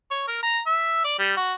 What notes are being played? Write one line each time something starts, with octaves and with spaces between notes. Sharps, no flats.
C#5
A#4
A#5
E5
D5
G3
F#4